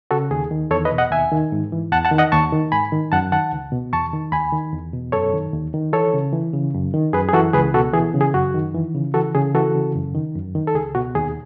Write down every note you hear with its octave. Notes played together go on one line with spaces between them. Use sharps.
C#3 F#4 A4
D#2 G#4
D#3
E2 A4 C#5
B4 D#5
B2
D#5 F#5
D#2 E5 G#5
D#3
G#2
E3
E2 F#5 A5
F#5 A5
D#3
D#5 F#5
D#2 A5 C#6
D#3
G#2 G#5 B5
D#3
F#2 F#5 A5
D#3 F#5 A5
C#2
B2
E2 A5 C#6
D#3
D#2 G#5 B5
D#3
E2
B2
F#2 A4 C#5
D#3
D#2
D#3
E3 A4 C#5
C#3
E3
C#3
F#2
D#3
F#2 G#4 B4
G#4
E3 F#4 A4
C#2 G#4 B4
B2 F#4 A4
E3 G#4
C#3
G#4
F#2 F#4
D#3
E3
C#3
E3 F#4 A4
C#3 G#4
E3 F#4 A4
C#3
F#2
D#3
F#2
D#3
A4
C#2 G#4
B2 F#4
D#2 G#4